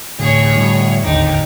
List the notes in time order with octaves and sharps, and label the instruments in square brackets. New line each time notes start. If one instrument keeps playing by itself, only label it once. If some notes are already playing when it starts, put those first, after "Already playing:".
[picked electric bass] D1 A1 D3 [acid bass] A2 [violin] G#4 C#5
[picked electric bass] B2 D3 G3
[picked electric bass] D1 G#1 D3 [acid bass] D#2 [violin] D#4 G4